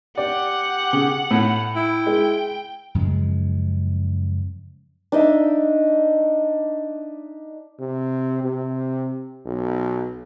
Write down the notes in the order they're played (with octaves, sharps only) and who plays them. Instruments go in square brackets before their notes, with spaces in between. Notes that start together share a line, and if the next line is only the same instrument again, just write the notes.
[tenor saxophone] G4 [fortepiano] D5 [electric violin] F#5
[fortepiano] C#3
A2
[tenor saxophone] E4 [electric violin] G5
[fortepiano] G#3
[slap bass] F#2 C#3 F3 G#3
[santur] D4 D#4 D#5 E5
[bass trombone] C3
C3
B1